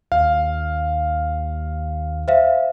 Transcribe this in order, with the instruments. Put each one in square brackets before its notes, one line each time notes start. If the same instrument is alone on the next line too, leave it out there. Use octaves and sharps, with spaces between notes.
[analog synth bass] D#2 [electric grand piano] F5
[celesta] C5 E5 F5